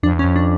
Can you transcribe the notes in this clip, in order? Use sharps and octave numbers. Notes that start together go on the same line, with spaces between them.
F2 D4
E2
C#4
F2
D4